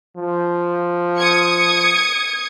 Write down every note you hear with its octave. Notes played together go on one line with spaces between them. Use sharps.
F3
D#6 G#6 C#7